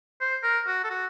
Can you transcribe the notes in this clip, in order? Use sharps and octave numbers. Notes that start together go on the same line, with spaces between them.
C5
A#4
F#4
A4
F#4